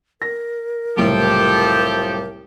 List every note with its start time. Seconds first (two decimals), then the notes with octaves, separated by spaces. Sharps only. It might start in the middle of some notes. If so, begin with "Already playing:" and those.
0.22 A#4 A#6
0.97 F#1 C2 A2 F3 G4 A4